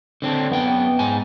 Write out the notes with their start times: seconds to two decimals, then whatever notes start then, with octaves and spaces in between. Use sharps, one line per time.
0.22 D3 C4 D4
0.50 F#2 B3 G5
0.99 G#2 G#5